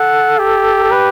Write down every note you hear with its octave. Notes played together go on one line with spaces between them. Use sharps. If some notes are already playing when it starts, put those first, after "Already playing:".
Already playing: A4 F#5
G4
A4
B4